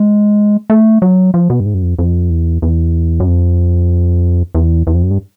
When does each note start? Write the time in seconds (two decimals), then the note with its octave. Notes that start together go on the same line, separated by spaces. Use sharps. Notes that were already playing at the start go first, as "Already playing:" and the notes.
Already playing: G#3
0.70 A3
1.02 F#3
1.34 F3
1.50 B2
1.60 G2
1.66 G#2
1.74 F#2
1.82 F2
1.99 F2
2.30 E2
2.62 E2
3.20 F#2
3.27 F2
4.55 E2
4.87 E2
4.95 F2
5.03 F#2
5.11 G2